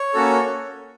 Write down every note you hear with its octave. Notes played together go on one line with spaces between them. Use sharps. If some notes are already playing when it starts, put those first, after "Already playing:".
Already playing: C#5
A#3 C#4 F#4 A4